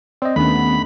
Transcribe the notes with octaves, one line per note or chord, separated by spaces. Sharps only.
C4 D5 D#5
D#2 A3 B3 C#4 D4 B5